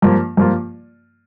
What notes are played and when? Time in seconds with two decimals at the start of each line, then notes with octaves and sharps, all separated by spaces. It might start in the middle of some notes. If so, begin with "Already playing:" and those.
0.02 G2 F3 A#3 F4
0.37 G2 F3 A#3 F4